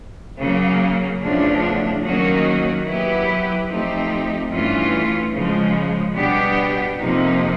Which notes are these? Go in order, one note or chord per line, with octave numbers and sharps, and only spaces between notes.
C#3 F#3 A#3
E2 C#3 F3 A3 D4
D#3 F#3 A#3 C#4 F#4
F#3 B3 E4 G4 B4
F3 A3 C4 D#4 G4
G2 E3 A3 C#4 F4
C#3 F3 G#3
B2 G3 B3 D4 G4
F2 C3 F3 A#3 D#4